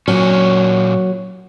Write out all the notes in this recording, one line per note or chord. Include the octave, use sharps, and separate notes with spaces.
A#2 F#3 C#4